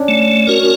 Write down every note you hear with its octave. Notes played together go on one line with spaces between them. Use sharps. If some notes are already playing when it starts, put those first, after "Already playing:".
Already playing: C#4 D4
A3
C#4 F#4 A#4